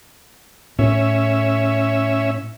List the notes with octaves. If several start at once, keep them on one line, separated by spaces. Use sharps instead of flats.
A2 C#4 E5